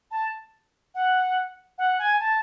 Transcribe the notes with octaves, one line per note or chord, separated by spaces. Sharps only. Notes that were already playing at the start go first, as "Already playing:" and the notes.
A5
F#5
F#5
G#5
A5